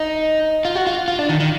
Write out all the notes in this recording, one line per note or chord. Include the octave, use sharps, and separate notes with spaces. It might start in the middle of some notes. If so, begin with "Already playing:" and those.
Already playing: D#4
F4
F#4
F4
F4
D4
D#3
D#3